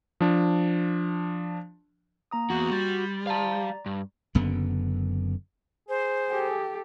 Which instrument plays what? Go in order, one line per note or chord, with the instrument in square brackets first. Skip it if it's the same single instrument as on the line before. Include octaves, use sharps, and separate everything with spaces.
[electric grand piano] F3 D4
[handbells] A#3 A#5 D#6
[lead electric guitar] E2 [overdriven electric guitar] F#4
[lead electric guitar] G3 [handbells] B5 C6 A6
[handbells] D5 A#5 A6 [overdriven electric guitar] F5 A5
[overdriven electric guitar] G2
[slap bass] F#1 F#2 D3 B3
[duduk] G#4 [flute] C5
[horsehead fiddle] G4 A4